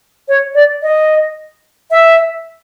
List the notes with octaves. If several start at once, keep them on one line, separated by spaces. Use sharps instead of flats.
C#5
D5
D#5
E5